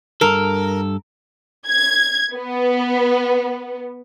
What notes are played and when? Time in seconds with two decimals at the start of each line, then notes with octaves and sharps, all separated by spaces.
0.21 G2 A4 A#4
1.68 G#6
2.34 B3